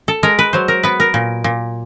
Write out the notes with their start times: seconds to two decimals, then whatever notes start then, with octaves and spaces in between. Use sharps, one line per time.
0.08 A4
0.23 G#3 A#4
0.39 B4
0.53 F#3 C5
0.68 A#4
0.83 B3 B4
1.00 A#4
1.14 A#2
1.44 A#2